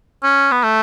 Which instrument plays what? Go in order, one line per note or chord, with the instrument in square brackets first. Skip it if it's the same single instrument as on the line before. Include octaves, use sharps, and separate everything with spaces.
[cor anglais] C#4
B3
A3